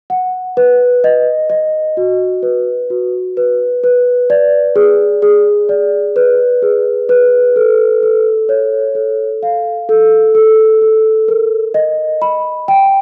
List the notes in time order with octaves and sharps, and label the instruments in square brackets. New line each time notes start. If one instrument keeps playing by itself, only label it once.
[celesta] F#5
B4
D#5
D#5
F#4
B4
F#4
B4
B4
D5
G#4
G#4
D5
B4
G#4
B4
A4
A4
C#5
A4
F5
A4
A4
A4
A#4
D#5
B5
G5